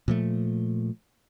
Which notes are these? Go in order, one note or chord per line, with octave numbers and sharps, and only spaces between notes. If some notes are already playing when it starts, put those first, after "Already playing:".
A#2 F3 A3